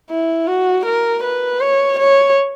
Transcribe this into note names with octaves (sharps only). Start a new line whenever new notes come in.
E4
F#4
A#4
B4
C#5
C#5